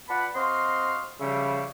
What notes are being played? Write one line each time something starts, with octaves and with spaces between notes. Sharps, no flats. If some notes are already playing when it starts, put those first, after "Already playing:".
F4 B4 D5 F#5 A5 B5
C4 F#4 D#5 F5 C6
C#3 F3 G3 E5